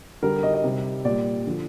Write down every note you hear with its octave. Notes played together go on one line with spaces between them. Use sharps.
D3 G3 A#4
D#5
D#5
C3 G3
A#2 G3 D5
D3 F3